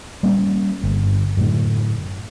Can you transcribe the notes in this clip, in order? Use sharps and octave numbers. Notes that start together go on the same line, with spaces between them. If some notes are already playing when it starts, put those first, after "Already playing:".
G3 A#3 C#4
G1
F#2 A2 D3